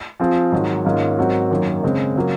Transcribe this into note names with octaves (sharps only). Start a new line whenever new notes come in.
F3 C4 F4 G#4
G#2 D#3 F#3
G#2 D#3 A#3 C#4 F4
G#2 F#3 C4 F#4 A#4
F#2 D#3 F#3 A#3
C#3 G#3 C4
C#3 F#3 A#3